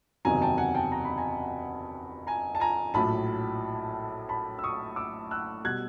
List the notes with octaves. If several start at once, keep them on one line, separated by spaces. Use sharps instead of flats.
F#1 E2 C3 D#3 F#3 G#5 A#5
G5 A5
F#5 G#5
G5 A5
A#5
B5
G#5 A#5
G#5 A#5
A5
G#5 A#5
A#1 A2 F#3 A5 B5
A5 B5
E6
C#6 D#6
D6 E6
E6 F#6
B2 G3 F#6 G#6